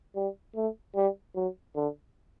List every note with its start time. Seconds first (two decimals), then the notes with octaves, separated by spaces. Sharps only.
0.16 G3
0.56 A3
0.96 G3
1.35 F#3
1.76 D3